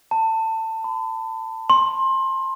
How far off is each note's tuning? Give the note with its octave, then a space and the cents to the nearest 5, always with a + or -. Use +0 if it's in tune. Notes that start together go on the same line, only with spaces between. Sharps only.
A5 +25
B5 +40
C6 +25